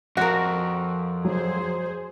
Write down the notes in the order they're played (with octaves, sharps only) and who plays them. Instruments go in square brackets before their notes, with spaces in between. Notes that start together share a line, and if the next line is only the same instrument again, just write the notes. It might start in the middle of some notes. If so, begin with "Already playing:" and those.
[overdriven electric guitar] F2 [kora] F#4 A#4
[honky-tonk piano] F#3 [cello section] G#4 C5